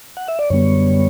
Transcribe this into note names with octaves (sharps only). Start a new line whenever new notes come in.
F#5
E5
D5
F#2 D3 G3 B3 C#5